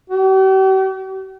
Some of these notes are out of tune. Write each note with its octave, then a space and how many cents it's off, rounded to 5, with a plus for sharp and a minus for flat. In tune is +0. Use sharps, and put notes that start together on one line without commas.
G4 -45